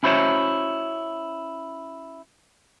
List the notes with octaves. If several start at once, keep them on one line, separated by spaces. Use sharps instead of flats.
C#4 E4 F#4 C5 C#5 E5